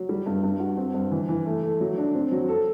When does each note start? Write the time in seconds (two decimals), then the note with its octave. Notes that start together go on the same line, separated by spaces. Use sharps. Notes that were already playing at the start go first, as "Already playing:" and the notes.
Already playing: F#3
0.09 G3
0.26 G2
0.43 G2
0.60 F#4
0.77 C4
0.94 G2
1.11 E3
1.29 E3
1.46 A3
1.63 A3
1.80 F#3
1.97 D4
2.15 C4
2.32 F#3
2.49 A4